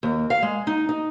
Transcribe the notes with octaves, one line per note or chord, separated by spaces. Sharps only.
D#2
F5
G#3
D#4
D#4